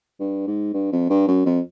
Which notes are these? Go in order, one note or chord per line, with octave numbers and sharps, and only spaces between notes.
G2
G#2
G2
F2
G2
F#2
F2